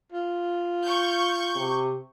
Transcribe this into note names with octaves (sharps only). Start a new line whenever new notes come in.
F4
C#6 G6
C3